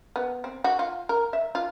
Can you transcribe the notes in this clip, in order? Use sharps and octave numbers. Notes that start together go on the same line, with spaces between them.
B3
C4
F#4
F4
A#4
E5
F4